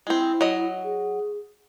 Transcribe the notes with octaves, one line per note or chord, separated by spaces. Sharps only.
G#3 C4 E4
F#3 D#5
G#4